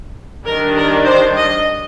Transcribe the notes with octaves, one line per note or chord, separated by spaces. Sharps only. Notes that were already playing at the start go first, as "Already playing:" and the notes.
D#3 G3 D4 A#4
A#4
C5
D#5